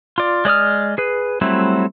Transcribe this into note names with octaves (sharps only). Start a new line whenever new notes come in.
F4 D5
G#3 D5 D#6 F6
G#4 B4
F#3 G3 A3 C4 E4